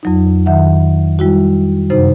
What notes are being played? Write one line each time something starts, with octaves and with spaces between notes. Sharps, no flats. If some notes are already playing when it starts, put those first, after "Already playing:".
F2 F#3 D#4
F2 D#3 E5 F#5
G3 E4 F#4
F#2 C3 D#4 C5